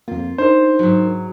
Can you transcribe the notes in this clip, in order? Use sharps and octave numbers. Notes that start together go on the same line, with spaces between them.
F2 A#3 F4
D4 D#4 A#4 C5
G#2 F#3